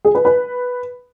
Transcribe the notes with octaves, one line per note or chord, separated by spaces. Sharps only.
G#4
B4
B4